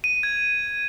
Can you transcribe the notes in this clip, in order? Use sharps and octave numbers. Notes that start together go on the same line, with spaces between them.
D#7
G#6